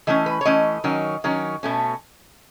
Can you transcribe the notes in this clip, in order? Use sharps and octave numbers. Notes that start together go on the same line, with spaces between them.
E3 A3 C#4 D#5
B4
C#5
E3 A3 C#4 D#5
D#3 F#3 C#4
D#3 F#3 C#4
B2 A3 C#4